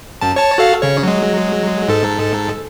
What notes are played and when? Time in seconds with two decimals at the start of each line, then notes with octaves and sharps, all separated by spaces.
0.21 F#2 A5
0.36 C#5 A5
0.58 F#4 A4 F5
0.82 C#3 C#5
1.03 F#3 G#3
1.88 G#2 A4